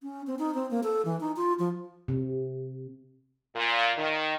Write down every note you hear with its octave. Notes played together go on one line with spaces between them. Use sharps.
C#4
C4
D#4
C4
A#3
A4
E3
D#4
F4
F3
C3
A#2
D#3